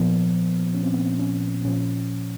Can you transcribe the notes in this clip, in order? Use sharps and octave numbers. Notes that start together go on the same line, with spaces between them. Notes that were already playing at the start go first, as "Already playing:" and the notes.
Already playing: A#2 F3 B3
C#4
C4
B3
C4
C#4
A#2 F3 C#4